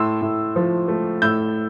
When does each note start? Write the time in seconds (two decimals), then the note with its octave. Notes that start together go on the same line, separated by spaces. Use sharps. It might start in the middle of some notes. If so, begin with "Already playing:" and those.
Already playing: A2 C6 E6
0.22 A2
0.56 F3
0.88 A3
1.22 A2 E6 G6